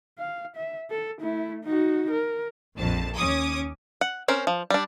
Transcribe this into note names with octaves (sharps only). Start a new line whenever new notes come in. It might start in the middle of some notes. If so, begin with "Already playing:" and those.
F5
E5
A4
A3 E4
D#4 F#4
A#4
A#1 F2 A5
D#2 C#4 D6 D#6 G#6
F#5
C4 C#4 A#4 C5
F3
G3 D4